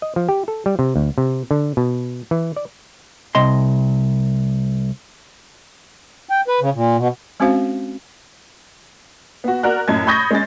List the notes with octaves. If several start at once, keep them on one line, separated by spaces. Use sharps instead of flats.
D#5
F3
G4
A4
G3
C3
D2
C3
D3
B2
E3
D5
C2 D#5 C6
G5
B4
C#3
A#2
B2
G#3 C4 C#4 F#4 C5 F5
B3 F#4
F#4 A#4 D5 F#6
F#2 A2 D#5 A5 G#6
B5 C#6 D#6 G6 G#6 A#6
G#3 C#4 A6